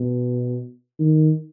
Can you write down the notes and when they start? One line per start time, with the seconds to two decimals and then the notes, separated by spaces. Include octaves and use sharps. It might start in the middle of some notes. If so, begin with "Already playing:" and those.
Already playing: B2
0.99 D#3